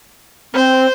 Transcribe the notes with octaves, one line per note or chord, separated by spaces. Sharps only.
C4 C5